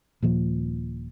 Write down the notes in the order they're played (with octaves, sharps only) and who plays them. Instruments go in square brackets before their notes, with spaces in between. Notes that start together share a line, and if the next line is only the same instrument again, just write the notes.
[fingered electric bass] D#1 A#2 F3